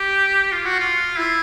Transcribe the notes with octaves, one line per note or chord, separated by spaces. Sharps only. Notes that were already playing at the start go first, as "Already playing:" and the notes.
Already playing: G4
F4
F#4
F4
E4